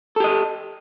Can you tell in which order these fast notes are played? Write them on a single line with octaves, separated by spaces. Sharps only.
A4 G4 D#5